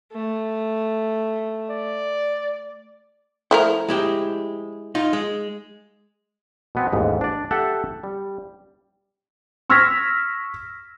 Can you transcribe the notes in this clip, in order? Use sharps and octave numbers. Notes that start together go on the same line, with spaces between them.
A3
D5
F3 A3 E4 A#4
G#3 E4 G4
D#4 F4
G#3
B2 B3 C4
A1 D#2 G#2
D4 D5
G4 A4 E5 F#5
G3
C#6 E6 F6 G#6 A#6 B6